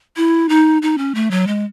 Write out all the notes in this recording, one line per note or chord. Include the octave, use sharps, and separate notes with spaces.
E4
D#4
D#4
C#4
A3
F#3
G#3